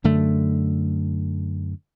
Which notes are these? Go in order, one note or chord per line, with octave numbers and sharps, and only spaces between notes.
F#2 D3 A3